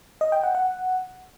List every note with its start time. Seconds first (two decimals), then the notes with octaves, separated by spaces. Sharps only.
0.21 D#5
0.32 G5
0.43 F#5
0.55 F#5